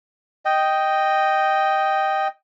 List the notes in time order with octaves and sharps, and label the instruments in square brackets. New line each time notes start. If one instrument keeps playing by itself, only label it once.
[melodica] D#5 G5